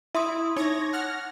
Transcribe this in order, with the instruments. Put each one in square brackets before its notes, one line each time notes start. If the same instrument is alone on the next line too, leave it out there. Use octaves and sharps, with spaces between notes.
[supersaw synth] E4 [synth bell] E5 C6 D#6
[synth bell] D#4 [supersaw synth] C#5 G#6 A#6
[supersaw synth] F#5 F6 A#6